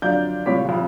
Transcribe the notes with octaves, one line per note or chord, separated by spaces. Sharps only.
F#2 D3 F3 D5 F5 G6
C#2 A2 G3 C#5 D6 B6
F1 F2